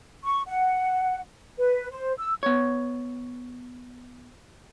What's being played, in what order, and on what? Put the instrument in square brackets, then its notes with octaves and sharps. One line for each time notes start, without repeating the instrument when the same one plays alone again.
[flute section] C#6
F#5
B4
C5
E6
[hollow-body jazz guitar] B3 C#5